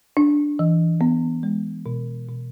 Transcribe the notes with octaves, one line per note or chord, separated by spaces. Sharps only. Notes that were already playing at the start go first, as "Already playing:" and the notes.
D4
E3
B3
G#3
B2
B2